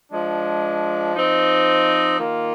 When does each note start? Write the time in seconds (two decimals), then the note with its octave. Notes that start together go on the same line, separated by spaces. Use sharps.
0.12 F3 G#3 D4
1.15 F3 C4 D#4
2.18 D#3 A#3 F4